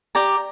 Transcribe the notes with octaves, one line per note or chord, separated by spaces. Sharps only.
G4 D5 A#5